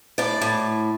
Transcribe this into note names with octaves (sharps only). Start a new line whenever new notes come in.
A2 D5
A2